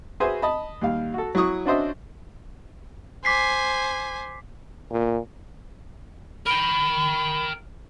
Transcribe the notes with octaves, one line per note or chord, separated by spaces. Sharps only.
F#4 G#4 B4 C5 E5 G#5
D#5 A5 B5
D#2 G3 F5
F#4 A4
F#3 E4 C#6 D#6
C#4 D4 F#4 C5 D#5 E5
C5 G#5 D6 B6 C7
A#2
A#4 G5 B5